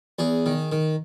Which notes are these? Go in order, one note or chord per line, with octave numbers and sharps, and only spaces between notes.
E2 G#4
D#3
D#3